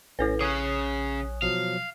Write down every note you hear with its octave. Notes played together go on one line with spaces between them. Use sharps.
A#1 A2 C#4 E4 A4 B4 A#6
C#3 C#4 C#5 G#5 D#6 F#6
B2 F3 F#3 F5